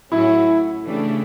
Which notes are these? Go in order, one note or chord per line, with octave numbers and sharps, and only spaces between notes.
A2 F#3 A3 C#4 E4 F#4
C#3 E3 A3 D4 G4